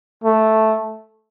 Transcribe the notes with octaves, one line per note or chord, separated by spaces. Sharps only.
A3